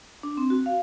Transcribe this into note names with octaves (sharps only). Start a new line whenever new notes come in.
D4
C4
F#4
F5